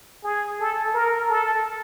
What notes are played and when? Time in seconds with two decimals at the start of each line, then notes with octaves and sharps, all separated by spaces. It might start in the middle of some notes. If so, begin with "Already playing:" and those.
0.24 G#4
0.60 A4
0.94 A#4
1.30 A4